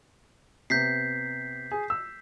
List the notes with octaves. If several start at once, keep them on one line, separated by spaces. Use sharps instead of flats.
C3 B3 G6 B6 C7
G#4
E6